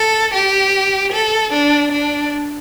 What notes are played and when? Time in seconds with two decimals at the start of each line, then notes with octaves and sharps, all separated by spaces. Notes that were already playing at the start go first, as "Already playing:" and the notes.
Already playing: A4
0.34 G4
1.13 A4
1.53 D4
1.92 D4